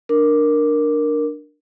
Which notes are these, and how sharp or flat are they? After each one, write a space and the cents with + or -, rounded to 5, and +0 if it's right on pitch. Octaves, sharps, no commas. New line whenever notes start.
D4 +15 A#4 +0 D6 +0